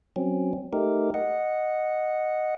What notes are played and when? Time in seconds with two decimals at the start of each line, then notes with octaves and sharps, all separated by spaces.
0.16 F#3 C4 C#4
0.73 A3 D#4 G4 A#4
1.14 D#5 F#5